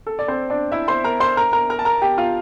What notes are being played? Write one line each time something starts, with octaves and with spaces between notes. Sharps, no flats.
A4
D5
C4 C5
D4 D5
E4 E5
C5 C6
A#4 A#5
C5 C6
A#4 A#5
A#4 A#5
A#4 A#5
A5
A#4 A#5
G4 G5
F4 F5